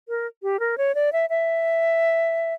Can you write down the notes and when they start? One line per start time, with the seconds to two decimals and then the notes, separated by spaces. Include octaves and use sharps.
0.09 A#4
0.43 G4
0.60 A#4
0.78 C#5
0.95 D5
1.13 E5
1.30 E5